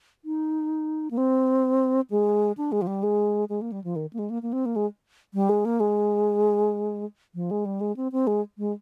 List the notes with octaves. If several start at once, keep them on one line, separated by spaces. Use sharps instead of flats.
D#4
A#3
C4
G#3
D4
G#3
F3
G3
G#3
G#3
A#3
G3
F3
D#3
A#3
G#3
A#3
A#3
C4
A#3
G#3
G3
G#3
A#3
G#3
F3
G#3
G3
G#3
C4
C4
G#3
G#3